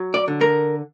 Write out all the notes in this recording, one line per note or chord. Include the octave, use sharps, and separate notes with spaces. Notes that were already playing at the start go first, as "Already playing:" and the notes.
Already playing: F#3
D5
D3
A#4